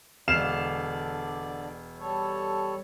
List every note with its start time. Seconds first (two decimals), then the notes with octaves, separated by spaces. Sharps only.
0.28 E1 D3 D5 F5 E7
1.98 G3 A4 C#5